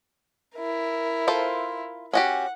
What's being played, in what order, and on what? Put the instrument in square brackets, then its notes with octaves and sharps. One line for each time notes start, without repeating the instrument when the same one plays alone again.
[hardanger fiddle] E4 A#4
[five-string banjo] F4 A4 C5
[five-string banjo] C#4 F#4 G4 [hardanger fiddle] F#5